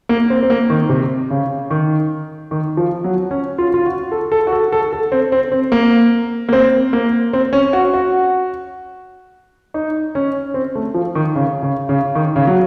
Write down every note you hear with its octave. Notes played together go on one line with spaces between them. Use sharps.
A#3
C4
C4
A#3
D#3
C3
C#3
D#3
D#3
F3
F#3
C#4
F4
F4
F#4
A4
A4
F#4
A4
A4
A4
C4
C4
C4
A#3
A#3
C4
A#3
C4
C#4
F#4
F#4
D#4
C#4
C4
A3
F3
D#3
C#3
C#3
C#3
D#3
C#3
F#3